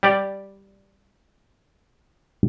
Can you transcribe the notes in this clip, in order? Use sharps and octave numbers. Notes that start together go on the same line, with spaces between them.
G3 G4 D5